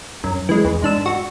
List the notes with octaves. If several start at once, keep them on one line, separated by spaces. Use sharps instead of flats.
F#2
E3 G#3
E2
G#2 D4 E6
F#4